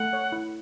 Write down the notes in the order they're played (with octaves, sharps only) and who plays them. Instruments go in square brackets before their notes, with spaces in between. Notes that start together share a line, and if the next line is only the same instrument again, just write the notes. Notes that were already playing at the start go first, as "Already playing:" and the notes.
Already playing: [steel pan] A3 [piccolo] F#5
[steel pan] C#5
E4